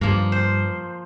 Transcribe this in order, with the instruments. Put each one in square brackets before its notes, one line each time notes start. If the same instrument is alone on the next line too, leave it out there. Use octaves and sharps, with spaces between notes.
[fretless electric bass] G2 [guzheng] F3 A#3
[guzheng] C5